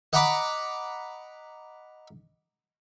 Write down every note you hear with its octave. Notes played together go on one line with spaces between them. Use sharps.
D#5 F#5 A#5 B5 D6